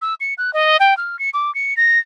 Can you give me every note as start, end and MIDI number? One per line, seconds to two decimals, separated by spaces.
0.02 0.14 88
0.21 0.34 97
0.38 0.53 90
0.53 0.77 75
0.80 0.97 79
0.97 1.19 89
1.19 1.30 97
1.34 1.53 86
1.55 1.76 97
1.77 1.99 94